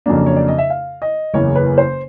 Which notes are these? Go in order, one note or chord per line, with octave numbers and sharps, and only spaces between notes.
F2 C#3 F#3 A#3 D4
C#5
D5
D#5
E5
F5
D#5
F#1 E2 C#3 C#5
B4
C5